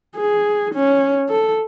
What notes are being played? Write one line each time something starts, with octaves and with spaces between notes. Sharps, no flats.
G#4
C#4
A4